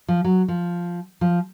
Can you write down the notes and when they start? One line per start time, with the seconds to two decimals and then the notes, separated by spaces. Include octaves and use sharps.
0.08 F3
0.24 F#3
0.48 F3
1.21 F3